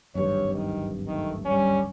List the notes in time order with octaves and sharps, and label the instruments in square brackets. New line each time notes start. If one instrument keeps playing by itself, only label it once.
[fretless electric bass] D1 G#1 G2 [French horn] C#5
[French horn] D#3
[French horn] D#3 [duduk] A3
[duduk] G3 [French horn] C#4